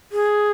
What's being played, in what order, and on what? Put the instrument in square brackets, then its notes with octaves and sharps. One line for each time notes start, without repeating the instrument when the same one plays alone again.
[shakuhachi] G#4